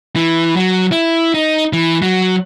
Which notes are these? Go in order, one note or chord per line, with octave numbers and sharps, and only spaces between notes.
E3
F#3
E4
D#4
E3
F#3